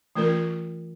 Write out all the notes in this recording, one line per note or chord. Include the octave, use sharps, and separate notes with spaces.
E3 A3 C#4 F4 A#4